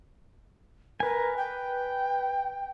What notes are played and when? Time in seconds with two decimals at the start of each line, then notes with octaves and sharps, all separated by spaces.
1.00 A#4 B4 G#5
1.37 G5